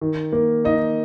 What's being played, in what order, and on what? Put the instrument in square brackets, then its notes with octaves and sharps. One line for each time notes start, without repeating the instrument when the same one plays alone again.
[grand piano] D#3
A#3
D#4 D#5